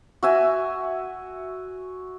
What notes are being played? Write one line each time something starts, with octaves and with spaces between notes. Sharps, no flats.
F#4 E5 G#5